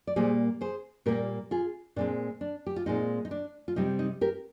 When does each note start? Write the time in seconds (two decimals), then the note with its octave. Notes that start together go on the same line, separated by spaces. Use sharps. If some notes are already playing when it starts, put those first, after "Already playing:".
0.07 D5
0.16 A#2 G3 A#3 G#4 C5
0.61 G#4 C5
1.06 A#2 G3 A#3 G4 A#4
1.51 F4 G#4
1.96 A#2 G#3 C4 D4
2.41 D4
2.67 G4
2.76 F4
2.86 A#2 G#3 C4 D#4
3.25 D#4
3.31 D4
3.68 F4
3.76 C3 G3 C4 D#4
3.99 D#4
4.21 G4 A#4